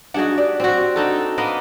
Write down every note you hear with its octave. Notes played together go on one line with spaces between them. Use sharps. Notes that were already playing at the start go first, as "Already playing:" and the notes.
D4 D#4 F#4 G#4 F#5
G4 D5
C4 F#4
D4 D#4 A4
A#3 B3 D#5